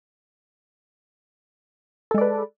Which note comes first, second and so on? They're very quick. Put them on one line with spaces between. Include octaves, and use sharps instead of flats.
A4 G#3 D5 B4